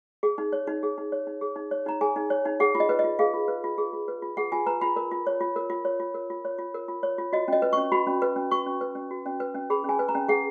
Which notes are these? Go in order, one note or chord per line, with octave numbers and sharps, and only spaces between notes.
G#4
D#4
C#5
D#4
G#4
D#4
C#5
D#4
G#4
D#4
C#5
D#4 A#5
G#4 G#5
D#4
C#5
D#4
G#4 F#5
F4
D#5
B4
D#5
F4
G#4 F5
F4
B4
F4
G#4
F4
B4
F4
G#4 F#5
F4 G#5
B4 A#5
F4 B5
A#4
F4
C#5
F4
A#4
F4
C#5
F4
A#4
F4
C#5
F4
A#4
F4
C#5
F4
F#4 D#5
C#4 D#5
B4
C#6
C#4
F#4 B5
C#4
B4
C#4
F#4 C#6
C#4
B4
C#4
F#4
C#4
B4
C#4
G#4 B5
C#4 G#5
B4
A#5
C#4
G#4 F#5